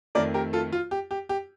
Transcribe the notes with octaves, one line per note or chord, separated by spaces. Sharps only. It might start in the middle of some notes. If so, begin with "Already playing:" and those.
F2 D#3 A3 A#4 D5
G4 A#4
F4 A4
F4
G4
G4
G4